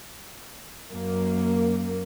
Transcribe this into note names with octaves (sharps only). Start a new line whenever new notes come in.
F#2 A#3